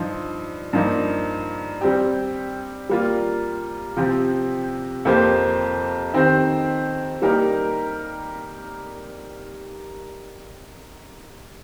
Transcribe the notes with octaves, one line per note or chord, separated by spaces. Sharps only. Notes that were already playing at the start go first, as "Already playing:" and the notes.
Already playing: G2 F3 D#4
G2 F3 A#3 D#4
G3 C4 G4
G3 A#3 F4
C3 F3 C4 G4
F2 F3 A#3 G4 C5
D#3 C4 D#4 G4 C5
G3 A#3 D#4 G4 A#4